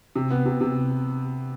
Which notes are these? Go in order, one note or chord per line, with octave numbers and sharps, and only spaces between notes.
C3
B3
C3
C3